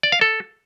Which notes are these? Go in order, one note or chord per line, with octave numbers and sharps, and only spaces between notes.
D5
F5
A4